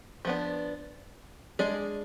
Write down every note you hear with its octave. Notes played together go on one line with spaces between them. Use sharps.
F3 B3 D4
G#3 D4 G#4 D5